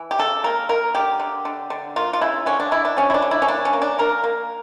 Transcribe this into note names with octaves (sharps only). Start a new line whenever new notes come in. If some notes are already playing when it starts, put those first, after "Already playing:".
Already playing: E3
G4
C#3 A4
A#3 A#4
A#3 A#4
D3 G4
D3
D3
D3
A#3 F4
F4
C#3 E4
D3 C#4
D4
D3 E4
D4
F3 C#4
E4
D4
D3
E4
C#4
A#3 D4
C#4
A#3
D4
A#3 A#4
A#3